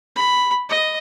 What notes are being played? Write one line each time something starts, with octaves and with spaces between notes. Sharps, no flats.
B5
D#5